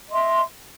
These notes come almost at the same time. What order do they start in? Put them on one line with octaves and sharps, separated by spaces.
D#5 C6 E5